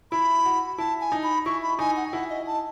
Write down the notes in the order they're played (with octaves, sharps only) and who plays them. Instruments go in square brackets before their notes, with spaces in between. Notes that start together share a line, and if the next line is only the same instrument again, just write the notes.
[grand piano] E4 [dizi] B5
[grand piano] F#4
[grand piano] E4 [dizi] A5
[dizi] G#5
[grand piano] D#4
[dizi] B5
[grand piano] E4 [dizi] C#6
[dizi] B5
[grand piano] D#4 [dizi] G#5
[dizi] F#5
G#5
[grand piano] E4 [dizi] F#5
[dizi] D#5
A5